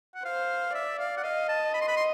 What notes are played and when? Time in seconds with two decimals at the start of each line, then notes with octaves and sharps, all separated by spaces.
0.15 F#5
0.25 C5 F5
0.74 D5 E5
0.99 F5
1.17 F#5
1.23 D#5 F5
1.49 A5
1.74 B5
1.81 C6
1.88 B5
1.96 C6